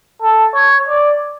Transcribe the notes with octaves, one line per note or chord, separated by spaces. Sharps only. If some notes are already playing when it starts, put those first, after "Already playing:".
A4
C#5
D5